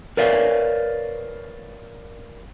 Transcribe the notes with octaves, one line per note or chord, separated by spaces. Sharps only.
A#4 B4 C#5 D5 E5 F5